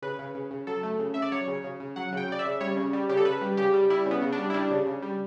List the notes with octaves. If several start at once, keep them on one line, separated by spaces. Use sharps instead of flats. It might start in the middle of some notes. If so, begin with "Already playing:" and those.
C#3 B4
C#3
C#3
C#3
F#3 A4
A3
C#3
C#3 E5
D5
F#3 C#5
C#3
C#3
C#3
F#3 F#5
C#3 G5
C#3 D5
E5
C#3
G3 C#5
C#3
G3
C#3 G4
A4
C#3 B4
G3
C#3 G4
G3
G3 E4
C#3
B3
C#3
D4
G3
E4
G3 D4
C#3
C#3
G3